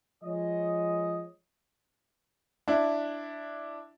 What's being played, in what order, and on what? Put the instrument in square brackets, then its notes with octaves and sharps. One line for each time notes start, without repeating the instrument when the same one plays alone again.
[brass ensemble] F3 G#3 C#5 D#5
[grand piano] D4 E4